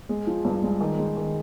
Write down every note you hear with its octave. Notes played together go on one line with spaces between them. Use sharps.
G#3
F3
G2
G#3
D#3
G#3
D#3